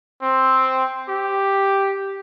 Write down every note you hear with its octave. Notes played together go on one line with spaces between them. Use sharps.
C4
G4